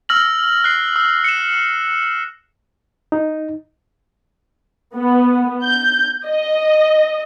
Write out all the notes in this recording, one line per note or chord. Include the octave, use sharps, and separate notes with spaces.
E6 F6 A#6 F#7
F#6 C7
E6
C#7 E7
D#4
B3
G6
D#5